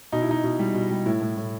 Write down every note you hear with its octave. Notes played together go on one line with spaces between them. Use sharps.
B2 D#4
E4
B2 D#4
B2
G3
B2
G3
A2 E4
A2
A2